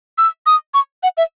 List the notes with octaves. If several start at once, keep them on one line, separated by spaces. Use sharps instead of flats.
E6
D#6
C#6
F#5
E5